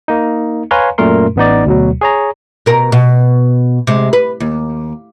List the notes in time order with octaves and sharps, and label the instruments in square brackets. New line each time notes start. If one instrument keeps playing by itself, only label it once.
[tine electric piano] A#3 D#4
B4 C#5 F5 G#5 A#5 C6
F#2 A#2 A3 A#4 C6
A1 B3 D#4 D5
D2 B2 F#3
G#4 C#5 A#5
[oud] B2 A#4
B2
C3 G#3
B4
D#2